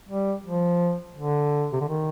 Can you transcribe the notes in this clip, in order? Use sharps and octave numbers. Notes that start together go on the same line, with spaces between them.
G3
F3
D3
C3
D3
D#3